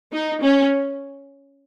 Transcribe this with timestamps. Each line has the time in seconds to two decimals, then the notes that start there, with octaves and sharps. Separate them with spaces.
0.12 D#4
0.42 C#4